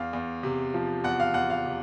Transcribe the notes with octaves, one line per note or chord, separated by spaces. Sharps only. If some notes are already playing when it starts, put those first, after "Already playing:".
Already playing: E2 F5
E2
C3
F3
E2 F#5
F5
E2 F#5
F5
C3